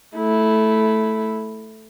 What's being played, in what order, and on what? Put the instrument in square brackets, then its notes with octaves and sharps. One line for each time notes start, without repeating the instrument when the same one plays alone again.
[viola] A3 E4